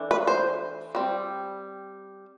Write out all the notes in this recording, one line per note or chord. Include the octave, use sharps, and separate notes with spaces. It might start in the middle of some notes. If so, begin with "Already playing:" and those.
Already playing: E3 A3 D4
B4
C5
G3 C4